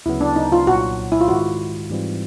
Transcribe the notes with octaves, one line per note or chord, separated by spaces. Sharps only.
D2 C#3 F#3 B3 E4
D4
D#4
F4
C2 A#2 F#3 F#4
E4
F4
G#2 D#3 G#3 F#4
G#2 E3 G3 C4 F4